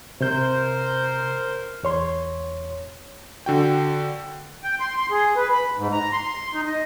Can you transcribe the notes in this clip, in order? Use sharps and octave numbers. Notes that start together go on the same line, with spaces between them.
C3 A#4 C5 G6
E2 C#5 C6
D3 F#4 G5
G5
C6
C6
G#4
B4
B5
G#2
A#5
C6
D#4
D#5